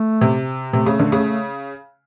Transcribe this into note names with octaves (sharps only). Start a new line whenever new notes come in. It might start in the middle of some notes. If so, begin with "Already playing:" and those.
Already playing: A3
C3
C3 A3
C#3
D3
C#3